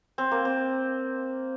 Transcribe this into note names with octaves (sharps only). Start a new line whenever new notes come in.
C4
A#3
C4